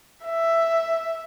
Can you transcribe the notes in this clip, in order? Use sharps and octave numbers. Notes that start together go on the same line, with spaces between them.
E5